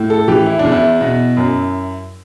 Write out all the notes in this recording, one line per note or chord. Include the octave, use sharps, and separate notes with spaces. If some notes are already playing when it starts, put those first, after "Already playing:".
Already playing: A2
A4
E3 G4
E4
D4
E2
E4
B2
F#2